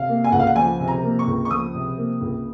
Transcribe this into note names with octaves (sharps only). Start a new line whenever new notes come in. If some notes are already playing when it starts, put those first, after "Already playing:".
Already playing: C3 F5
A#3
G#5
C#2 F#5
F5
F#5
F3 G#5
C3
A#5
A#3
C#6
C#2
C#6
F3 D#6
C3
A#3
C#2